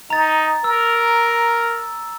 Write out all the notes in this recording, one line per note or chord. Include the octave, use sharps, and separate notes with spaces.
D#4 A#5 A6
A#4 E6